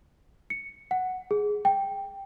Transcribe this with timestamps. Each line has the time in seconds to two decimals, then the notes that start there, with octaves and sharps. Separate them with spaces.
0.50 C#7
0.91 F#5
1.31 G#4
1.65 G5